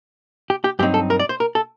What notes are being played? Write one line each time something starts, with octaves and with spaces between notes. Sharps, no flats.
G4
G4
G2 F#3 C4 D#4 G4
A4
A#4
D5
C5
A#4
A4